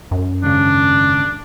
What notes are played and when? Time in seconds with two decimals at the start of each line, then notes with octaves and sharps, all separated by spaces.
0.11 F#2
0.42 D#2 G#2 C#3 D4